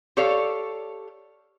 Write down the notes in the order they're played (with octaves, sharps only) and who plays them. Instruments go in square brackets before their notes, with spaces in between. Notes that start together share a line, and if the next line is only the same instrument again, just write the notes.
[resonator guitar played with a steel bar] G4 A4 C#5 D5 F5